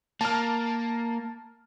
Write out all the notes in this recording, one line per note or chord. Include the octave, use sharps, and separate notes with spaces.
A#3 A5 F6